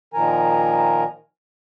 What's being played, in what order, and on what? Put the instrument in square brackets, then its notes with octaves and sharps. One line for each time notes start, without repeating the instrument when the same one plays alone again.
[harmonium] A#2 D#3 F3 A#4 G#5 A#5